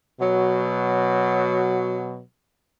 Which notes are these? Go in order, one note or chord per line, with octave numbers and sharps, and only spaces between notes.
B2 F#3